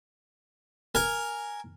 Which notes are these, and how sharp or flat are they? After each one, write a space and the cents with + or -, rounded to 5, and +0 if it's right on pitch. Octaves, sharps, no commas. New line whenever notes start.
A#4 +0 G#5 +0